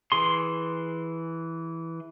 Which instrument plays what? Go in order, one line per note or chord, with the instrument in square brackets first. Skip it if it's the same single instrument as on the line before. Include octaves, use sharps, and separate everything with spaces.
[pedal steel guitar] E3 G#4 C6